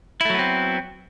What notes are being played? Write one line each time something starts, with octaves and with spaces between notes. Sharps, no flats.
F#3 A3 B3 C4 E4